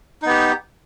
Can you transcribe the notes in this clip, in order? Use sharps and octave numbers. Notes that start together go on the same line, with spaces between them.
B3 D#4 G4